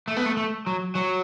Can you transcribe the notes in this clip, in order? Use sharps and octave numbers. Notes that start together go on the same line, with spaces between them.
A3
B3
A3
A3
F#3
F#3